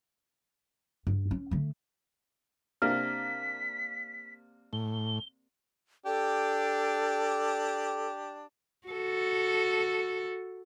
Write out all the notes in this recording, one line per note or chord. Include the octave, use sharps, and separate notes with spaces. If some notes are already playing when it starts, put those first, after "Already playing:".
G2
C#4
D3 A3
C3 A#3 D4 F6 B6
A2 G7
D4 G4 A4
F#4 A4